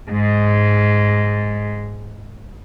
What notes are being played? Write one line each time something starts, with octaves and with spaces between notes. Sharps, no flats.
G#2 G#3